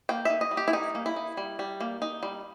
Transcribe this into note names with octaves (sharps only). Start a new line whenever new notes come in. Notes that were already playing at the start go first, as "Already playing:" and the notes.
A#3 G5
D#4 E5
D#5
G3
G4
E4
G3 D#4
A#3
E4
D#4
G3
G3
A#3
D#4
G3